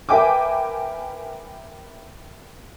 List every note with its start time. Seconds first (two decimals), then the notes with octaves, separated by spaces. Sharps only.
0.09 A#4 B4 E5 G5 G#5 D6